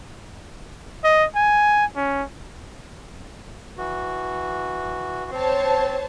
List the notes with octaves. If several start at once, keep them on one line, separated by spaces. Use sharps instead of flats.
D#5
G#5
C#4
E3 F#4
C4 C5 C#5 A5